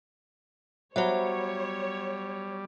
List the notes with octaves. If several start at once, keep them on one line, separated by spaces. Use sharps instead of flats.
F#3 G3 B3 C5 C#5 E5